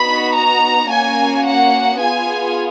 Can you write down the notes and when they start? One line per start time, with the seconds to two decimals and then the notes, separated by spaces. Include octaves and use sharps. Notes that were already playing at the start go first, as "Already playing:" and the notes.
Already playing: B3 D#4 F#4 B5
0.35 A#5
0.90 A#3 C#4 F#4 G#5
1.45 F#5
2.00 B3 F4 G#4 G#5